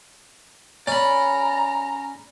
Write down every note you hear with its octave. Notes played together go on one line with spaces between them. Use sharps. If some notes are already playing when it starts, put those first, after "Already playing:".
C#4 D5 A#5 B5